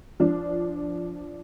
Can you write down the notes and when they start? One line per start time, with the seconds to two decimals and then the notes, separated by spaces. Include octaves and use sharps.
0.20 F3 D4